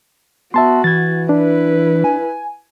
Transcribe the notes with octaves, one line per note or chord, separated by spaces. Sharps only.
B3 F#4 E5 A5 C6
E3 G#6 A6
D4 E4 B4
G#5